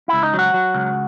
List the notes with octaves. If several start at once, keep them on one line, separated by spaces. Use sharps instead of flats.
C#2 E4
D#4
F#3
F#4
F#3
C#2